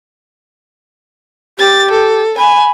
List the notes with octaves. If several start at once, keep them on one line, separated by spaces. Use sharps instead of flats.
G4 A6
A4
G#5 B5